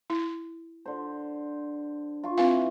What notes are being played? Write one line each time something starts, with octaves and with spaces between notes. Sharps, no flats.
E4
D3 C5
F4 C#6
E3 C4 F5